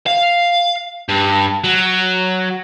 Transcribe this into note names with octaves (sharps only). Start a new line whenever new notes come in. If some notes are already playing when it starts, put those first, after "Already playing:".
F5
G2
F#3